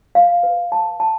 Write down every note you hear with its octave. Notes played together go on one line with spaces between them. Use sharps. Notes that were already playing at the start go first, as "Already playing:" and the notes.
F5
B4
A5
A5